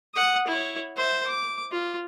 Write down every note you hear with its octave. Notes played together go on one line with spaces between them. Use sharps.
F#5 D#6
E4 C#5
C5 E5
D6
F4